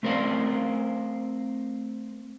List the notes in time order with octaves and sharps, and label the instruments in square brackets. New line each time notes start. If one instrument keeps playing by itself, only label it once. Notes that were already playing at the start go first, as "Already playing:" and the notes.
[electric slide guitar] A3 C4 A#4 C5 D5 F5